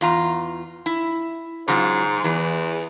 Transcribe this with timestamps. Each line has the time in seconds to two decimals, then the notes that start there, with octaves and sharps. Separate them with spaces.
0.01 E2 F4 A#5
0.86 E4
1.68 G#2 C#3 F#3 F4
2.24 E2 E3